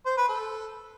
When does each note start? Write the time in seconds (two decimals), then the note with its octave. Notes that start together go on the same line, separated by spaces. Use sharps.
0.06 C5
0.17 B4
0.29 A4